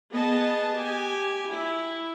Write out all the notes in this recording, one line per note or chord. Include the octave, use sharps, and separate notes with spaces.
B3 G#4 D#5 A5
G4 G#5
E4